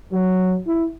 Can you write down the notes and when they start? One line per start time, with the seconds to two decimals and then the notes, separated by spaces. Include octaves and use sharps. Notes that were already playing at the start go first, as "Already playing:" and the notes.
0.12 F#3
0.67 E4